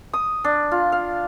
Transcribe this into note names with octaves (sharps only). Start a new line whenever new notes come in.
D#6
D4
F4
F5